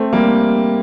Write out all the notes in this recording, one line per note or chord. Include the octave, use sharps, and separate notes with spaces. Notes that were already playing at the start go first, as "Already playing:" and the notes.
Already playing: A3 C4
G3 A#3